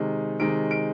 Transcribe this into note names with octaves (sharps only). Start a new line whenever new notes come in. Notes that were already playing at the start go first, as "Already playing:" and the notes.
Already playing: C3 D#3 G#3
C3 D#3 G#3 D7
D7